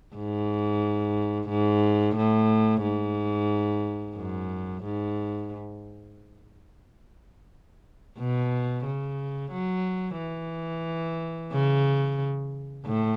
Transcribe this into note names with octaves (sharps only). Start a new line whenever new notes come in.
G#2
G#2
A2
G#2
F#2
G#2
B2
C#3
F#3
E3
C#3
A2